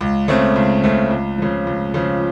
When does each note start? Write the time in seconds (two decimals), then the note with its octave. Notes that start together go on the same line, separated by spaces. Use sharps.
0.01 C#2
0.28 C#3 A3 C4
0.56 C#2
0.84 C#3 A3 C4
1.10 C#2
1.38 C#3 F3
1.67 C#2
1.94 C#3 F3